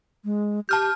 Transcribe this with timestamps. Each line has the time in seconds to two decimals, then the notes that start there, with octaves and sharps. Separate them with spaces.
0.25 G#3
0.69 G4 A5 F6 G6